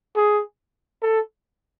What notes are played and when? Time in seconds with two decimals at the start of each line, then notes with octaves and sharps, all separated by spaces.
0.16 G#4
1.03 A4